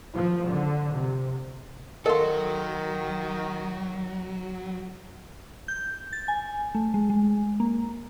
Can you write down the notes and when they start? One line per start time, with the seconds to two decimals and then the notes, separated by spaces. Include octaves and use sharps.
0.14 F3
0.48 D3
0.94 C3
2.06 D#3 F#3 A4 A#4 D#5 F5 C6
5.68 G6
6.13 A6
6.28 G#5
6.75 A3
6.94 G#3
7.10 G#3
7.60 A#3